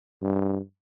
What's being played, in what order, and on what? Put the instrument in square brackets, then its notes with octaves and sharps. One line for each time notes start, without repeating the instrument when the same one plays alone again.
[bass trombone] G2